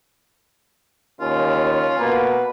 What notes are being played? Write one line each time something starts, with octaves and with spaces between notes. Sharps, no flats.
D#2 C#4 F4
B2 A#3 B4